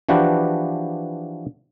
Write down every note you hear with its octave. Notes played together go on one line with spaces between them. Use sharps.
E3 F3 D4 F#4 G4 B4